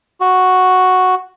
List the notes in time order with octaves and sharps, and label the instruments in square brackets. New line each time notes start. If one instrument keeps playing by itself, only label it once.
[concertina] F#4